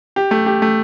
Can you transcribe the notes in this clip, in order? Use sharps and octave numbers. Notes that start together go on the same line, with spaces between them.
G4
A3
G4
A3